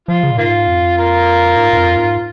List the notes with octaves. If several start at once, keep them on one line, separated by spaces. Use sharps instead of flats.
F3 F4
C#3
A#2
G#2 A#3 F4
F2
F4 A#4
G#2
G#2
F2
G#2